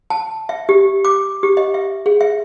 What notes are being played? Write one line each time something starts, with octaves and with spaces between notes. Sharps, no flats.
A5
E5
G4
D6
G4
D#5
E5
G#4
E5